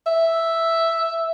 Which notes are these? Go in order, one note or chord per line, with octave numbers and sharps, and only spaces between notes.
E5